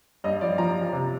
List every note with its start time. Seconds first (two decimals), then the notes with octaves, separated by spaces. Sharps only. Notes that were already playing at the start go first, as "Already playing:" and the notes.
0.24 G2 D#5
0.41 F3 D5
0.58 F3 A#5
0.76 F3
0.92 C3